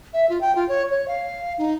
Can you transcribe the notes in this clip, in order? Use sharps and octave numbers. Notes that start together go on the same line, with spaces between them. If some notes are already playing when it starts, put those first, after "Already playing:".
E5
F4
G5
F4
C#5
C#5
F5
D#4